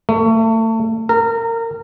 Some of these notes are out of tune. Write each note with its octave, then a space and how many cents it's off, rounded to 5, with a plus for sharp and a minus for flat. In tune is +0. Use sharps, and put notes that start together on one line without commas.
A3 +30
A#4 -25